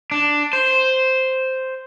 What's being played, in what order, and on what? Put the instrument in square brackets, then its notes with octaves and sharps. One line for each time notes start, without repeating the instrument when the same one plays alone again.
[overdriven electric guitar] D4
C5